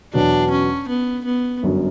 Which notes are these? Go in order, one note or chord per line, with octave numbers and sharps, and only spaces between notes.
E2 B2 F#3 D4
C#4
B3
B3
G1 F#2 D3 F#3